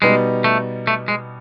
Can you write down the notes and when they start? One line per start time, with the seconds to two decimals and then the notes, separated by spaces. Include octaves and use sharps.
0.02 B2 G3 G#3 B3 D#4
0.44 A3
0.87 A3
1.08 G#3